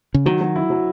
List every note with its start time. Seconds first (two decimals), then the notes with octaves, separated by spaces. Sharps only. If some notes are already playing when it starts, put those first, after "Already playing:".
0.14 C#3
0.26 D#3 F#3
0.41 F#3
0.56 E4
0.70 F#3